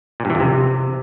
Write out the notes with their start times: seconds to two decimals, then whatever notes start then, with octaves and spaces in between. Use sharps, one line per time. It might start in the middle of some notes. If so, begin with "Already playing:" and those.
0.20 A#2
0.25 G2
0.30 E3
0.35 F2
0.40 C3